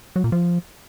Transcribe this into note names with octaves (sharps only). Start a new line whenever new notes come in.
F#3
A#2
F3